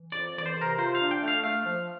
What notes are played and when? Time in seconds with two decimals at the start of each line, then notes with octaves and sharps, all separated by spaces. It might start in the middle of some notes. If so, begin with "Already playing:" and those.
Already playing: E3
0.12 F2 D5
0.35 E3 D5
0.46 C5
0.56 C3
0.61 A#4
0.78 F4 C5
0.95 F5
1.01 D4
1.11 G5
1.22 A3
1.28 F5
1.43 A3 F5
1.65 F3